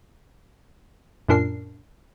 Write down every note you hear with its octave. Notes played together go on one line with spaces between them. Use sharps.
F#2 A#2 D4 A#4 C7